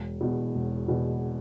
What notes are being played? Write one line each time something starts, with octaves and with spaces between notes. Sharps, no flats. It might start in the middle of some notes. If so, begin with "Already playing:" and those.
Already playing: E1
E2 B2
E1
E2 B2